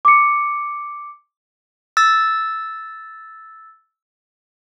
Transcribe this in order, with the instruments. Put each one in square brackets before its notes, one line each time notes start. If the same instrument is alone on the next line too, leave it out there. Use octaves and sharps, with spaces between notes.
[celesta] D6 C#7
[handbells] E6 A6